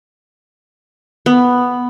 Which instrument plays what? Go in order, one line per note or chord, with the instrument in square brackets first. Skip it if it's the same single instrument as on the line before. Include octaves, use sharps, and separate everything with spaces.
[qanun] B3